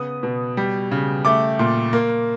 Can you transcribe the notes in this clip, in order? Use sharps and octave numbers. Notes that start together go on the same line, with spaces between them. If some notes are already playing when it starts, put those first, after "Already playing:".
Already playing: C#3 B3 D#6
B2
G3
C#3
A3 D6
A#2
A#3